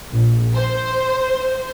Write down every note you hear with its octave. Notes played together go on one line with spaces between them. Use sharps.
A#1
C5